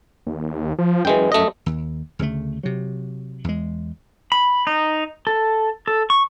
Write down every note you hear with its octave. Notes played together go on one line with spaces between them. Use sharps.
D#2
F3
F#2 E3 G#3 G5
A3 D#5
D#2
D2 C#3 F3 A3
C3 F#3
E2 G#3
B5
D#4
A4
A4
C#6